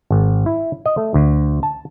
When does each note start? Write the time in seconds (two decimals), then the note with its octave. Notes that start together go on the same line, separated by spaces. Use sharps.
0.10 G#1
0.46 E4
0.86 D#5
0.97 A3
1.14 D2
1.63 A5